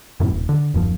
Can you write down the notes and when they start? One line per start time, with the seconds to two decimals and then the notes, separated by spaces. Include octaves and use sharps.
0.20 F#2 A2 C3
0.31 D#1
0.49 D3
0.74 D#1 F#2 F3